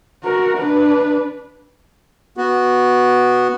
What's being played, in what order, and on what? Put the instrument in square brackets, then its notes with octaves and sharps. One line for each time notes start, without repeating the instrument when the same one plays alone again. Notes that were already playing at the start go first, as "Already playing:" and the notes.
[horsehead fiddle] F#4 A#4
D4 B4
[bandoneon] B3 F#4